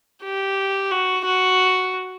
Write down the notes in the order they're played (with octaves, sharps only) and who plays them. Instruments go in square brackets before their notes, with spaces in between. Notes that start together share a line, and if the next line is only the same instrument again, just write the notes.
[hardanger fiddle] G4
F#4
F#4